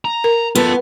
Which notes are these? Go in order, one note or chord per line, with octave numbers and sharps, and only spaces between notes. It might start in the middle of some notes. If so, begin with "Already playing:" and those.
A#5
A#4
B3 F4 A4